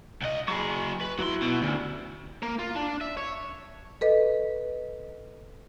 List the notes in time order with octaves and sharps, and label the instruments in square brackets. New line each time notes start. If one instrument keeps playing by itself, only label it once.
[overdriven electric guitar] C2 D#5
[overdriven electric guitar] F#3 G#4 [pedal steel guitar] B5 C#6
[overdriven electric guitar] B4
[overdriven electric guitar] F#3 C6 [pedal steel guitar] E4 F#4
[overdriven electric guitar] B2
[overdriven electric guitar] D2 [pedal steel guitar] C#4 G4
[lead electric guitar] A#3
F4
D4
E5
C#5
[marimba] A4 B4 D#5